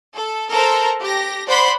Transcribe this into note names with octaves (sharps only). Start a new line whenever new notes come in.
A4
A4 A#4 C5 A#5
G4 A#6
C5 D5 F#5 B5 C6 B6